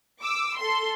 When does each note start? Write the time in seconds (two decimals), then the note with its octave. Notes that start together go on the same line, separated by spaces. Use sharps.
0.21 D6 E6
0.58 A4 C6